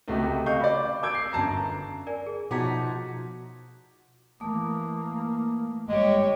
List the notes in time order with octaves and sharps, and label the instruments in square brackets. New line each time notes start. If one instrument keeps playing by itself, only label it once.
[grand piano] C#2 C3 A3 F#4 G4
D#5 F5 C#6 G6
D5 B5
D6 E6 G6 G#6 D7
C7
G1 F#2 A5 A#5 C7
[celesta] A#4 D5 G#5
G#4
[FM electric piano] B2 A#5 G#6 [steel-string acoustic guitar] F3 D#4 F#4 [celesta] D6 B6
[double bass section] E3 A#3 [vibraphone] A3 D6 D#6
[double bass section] G1 G3 [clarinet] G#3 [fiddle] G4 C#5